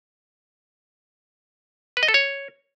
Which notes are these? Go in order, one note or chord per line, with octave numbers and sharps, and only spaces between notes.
B4
D#5
A4
C#5